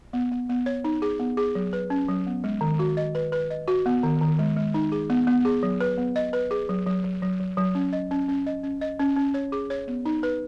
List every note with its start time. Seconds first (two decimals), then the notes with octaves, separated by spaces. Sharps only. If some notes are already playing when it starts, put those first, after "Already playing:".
0.13 B3
0.31 B3
0.49 B3
0.66 C#5
0.84 D#4
1.02 G#4
1.19 B3
1.37 G#4
1.55 F#3
1.73 B4
1.90 C#4
2.08 F#3
2.26 B3
2.44 G#3
2.61 D#3
2.79 F#4
2.97 D#5
3.15 B4
3.32 B4
3.50 D#5
3.68 F#4
3.86 B3
4.03 D#3
4.21 D#3
4.39 G#3
4.56 G#3
4.74 D#4
4.92 G#4
5.10 B3
5.27 B3
5.45 G#4
5.63 F#3
5.81 B4
5.98 B3
6.16 D#5
6.33 B4
6.51 G#4
6.69 F#3
6.86 F#3
7.04 F#3
7.22 F#3
7.40 F#3
7.57 F#3
7.75 C#4
7.93 D#5
8.11 C#4
8.28 C#4
8.47 D#5
8.63 C#4
8.81 D#5
8.99 C#4
9.16 C#4
9.34 C#5
9.52 G#4
9.70 C#5
9.88 B3
10.05 D#4
10.23 B4